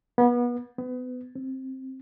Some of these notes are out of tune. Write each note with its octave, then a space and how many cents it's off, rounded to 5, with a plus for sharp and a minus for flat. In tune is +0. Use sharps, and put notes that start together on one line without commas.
B3 -30
B3 +30
C4 +10